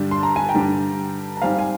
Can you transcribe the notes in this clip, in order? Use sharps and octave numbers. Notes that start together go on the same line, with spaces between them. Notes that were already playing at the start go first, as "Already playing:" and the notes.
Already playing: G2 D3 G3 D4
C6
A#5
G#5
G5 A#5
G2 D3 G3 D4
A#5
G#2 G3 C4 F5 G#5
G#5